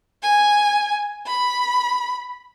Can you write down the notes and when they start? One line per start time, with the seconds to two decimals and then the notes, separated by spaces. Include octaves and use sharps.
0.23 G#5
1.26 B5